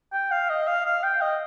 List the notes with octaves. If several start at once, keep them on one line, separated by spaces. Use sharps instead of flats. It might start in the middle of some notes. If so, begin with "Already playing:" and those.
G5
F5
D#5
F5
F5
G5
D#5